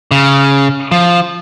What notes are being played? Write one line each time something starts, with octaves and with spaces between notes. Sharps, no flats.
C#3
F3